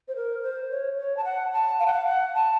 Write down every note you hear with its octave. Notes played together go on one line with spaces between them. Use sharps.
C5
A#4
C5
C#5
C#5
A5
F#5
A5
F5
F#5
F5
F#5
A5